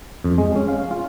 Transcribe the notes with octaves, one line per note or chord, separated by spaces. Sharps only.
F2
G#3
C#4
F5
F4